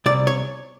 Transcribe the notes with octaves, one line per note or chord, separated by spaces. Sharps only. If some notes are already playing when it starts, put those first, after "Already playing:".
C2 D5
C#5